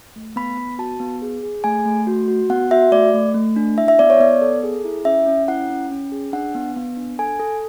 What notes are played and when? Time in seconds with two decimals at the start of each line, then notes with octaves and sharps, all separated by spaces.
0.16 A3
0.36 B3 B5
0.57 B3
0.79 F#4 A5
1.00 B3
1.22 G#4
1.43 G#4
1.64 A3 G#5
1.86 A3
2.07 F#4
2.28 F#4
2.50 B3 F#5
2.71 F#4 E5
2.92 A3 D5
3.14 A3
3.35 A3
3.56 D4
3.78 E4 E5
3.88 E5
3.99 B3 D5
4.10 C#5
4.20 B3 D5
4.42 A4
4.63 G#4
4.85 E4
5.05 C#4 E5
5.26 C#4
5.48 E4 F#5
5.70 C#4
5.91 C#4
6.12 G#4
6.33 D4 F#5
6.55 B3
6.76 B3
6.97 D4
7.19 A4 G#5
7.40 A4